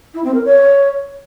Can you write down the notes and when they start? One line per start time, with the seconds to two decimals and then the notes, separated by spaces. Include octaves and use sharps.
0.14 E4
0.24 C4
0.34 A#4
0.44 C#5